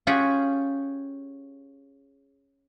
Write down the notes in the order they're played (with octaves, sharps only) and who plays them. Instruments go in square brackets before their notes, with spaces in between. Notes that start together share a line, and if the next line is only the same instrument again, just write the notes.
[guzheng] C#4 F4 G4 G#4 F#5 G#5